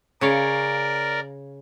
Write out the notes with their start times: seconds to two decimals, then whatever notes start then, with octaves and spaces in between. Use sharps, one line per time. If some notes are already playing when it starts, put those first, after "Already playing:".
0.21 C#3 A#4 C#5 D5 F5